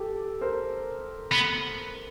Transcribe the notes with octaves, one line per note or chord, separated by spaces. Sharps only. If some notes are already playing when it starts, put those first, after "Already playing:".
Already playing: G4 A4
A#4 C5
B3